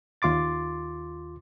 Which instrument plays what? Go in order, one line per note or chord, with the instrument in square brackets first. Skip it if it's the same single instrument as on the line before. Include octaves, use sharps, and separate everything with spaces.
[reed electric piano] D#2 F4 C6 D6 A6